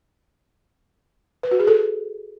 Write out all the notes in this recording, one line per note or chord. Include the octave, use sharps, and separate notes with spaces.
B4
F#4
G#4
A4